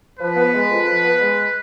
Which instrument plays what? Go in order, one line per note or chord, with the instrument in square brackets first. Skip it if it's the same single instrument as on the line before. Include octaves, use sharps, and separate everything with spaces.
[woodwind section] F3 [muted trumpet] B4
[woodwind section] B3
G#3
F2
F3
B3
G#3